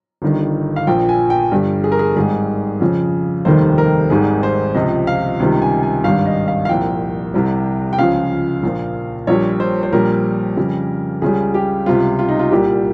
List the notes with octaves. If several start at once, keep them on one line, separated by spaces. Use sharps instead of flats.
G1 G2 D#3
F5
A#1 A#2 F3 G5
G#5
G5
G1 G2 G3
G#4
A#4
G#4
G#1 G#2 D#3 G3 G#4
F2 C#3 F3
F1 D#2 D#3 G3 C5
A#4
G#1 G#2 D#3 G3 G#4
C5
C#2 C3 F3 D#5
F5
C#2 C3 D#3 G3
G#5
G#5
G#1 G2 G3 F5
D#5
F5
F5
C2 A#2 F3 G5
C2 C3 G3
G5
C#2 C#3 F3 F5
A#1 A#2 F3
A#1 A#2 G3 C#5
C5
C5
A#1 A#2 G3 A#4
F2 C#3 G3
C#2 C#3 G3 G#4
G4
C#2 C3 G3 F4
F4
D#4
F4
C2 A#2 G3 G4